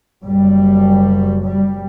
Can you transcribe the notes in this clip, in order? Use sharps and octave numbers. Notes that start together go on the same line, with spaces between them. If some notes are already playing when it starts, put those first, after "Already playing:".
F#1 F#2 G3
G3